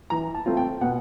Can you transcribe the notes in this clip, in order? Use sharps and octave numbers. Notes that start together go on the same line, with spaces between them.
E3 A#5
A5
A3 C4 F4
G5
B2 F#5